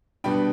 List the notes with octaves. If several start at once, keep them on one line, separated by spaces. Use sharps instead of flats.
B2 G3 B3 D4 G5 B5